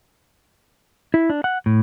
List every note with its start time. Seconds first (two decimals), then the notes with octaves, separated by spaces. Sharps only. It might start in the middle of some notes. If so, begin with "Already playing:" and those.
1.14 E4
1.30 D4
1.44 F#5
1.66 A2